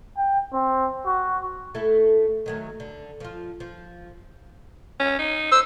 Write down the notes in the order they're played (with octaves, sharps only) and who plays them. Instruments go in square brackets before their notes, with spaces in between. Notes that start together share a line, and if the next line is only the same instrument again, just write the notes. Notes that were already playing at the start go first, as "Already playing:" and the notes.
[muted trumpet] G5
C4
F#4
[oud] A3 E4 A4
D#3 F#3 A3
D3
F3 F4
F3
[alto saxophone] C#4
D#4
[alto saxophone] C5 [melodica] E6